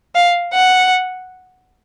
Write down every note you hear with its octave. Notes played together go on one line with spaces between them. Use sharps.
F5
F#5